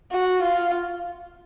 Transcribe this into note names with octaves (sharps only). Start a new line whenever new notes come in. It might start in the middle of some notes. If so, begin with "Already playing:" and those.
F#4
F4